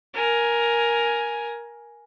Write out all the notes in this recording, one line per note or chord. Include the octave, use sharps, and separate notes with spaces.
A#4 G#5